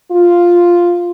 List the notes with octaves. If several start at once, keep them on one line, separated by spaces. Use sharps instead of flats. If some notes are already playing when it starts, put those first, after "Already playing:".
F4